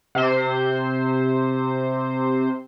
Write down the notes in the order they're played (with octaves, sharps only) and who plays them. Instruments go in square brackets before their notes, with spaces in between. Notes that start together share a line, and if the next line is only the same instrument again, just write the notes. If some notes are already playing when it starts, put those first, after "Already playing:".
[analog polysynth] C3 C5